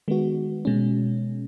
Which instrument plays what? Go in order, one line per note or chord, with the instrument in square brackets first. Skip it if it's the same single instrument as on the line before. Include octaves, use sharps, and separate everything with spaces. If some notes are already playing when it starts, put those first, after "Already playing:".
[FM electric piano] D#3 G#3 B3 F#4
B2 G#3 C#4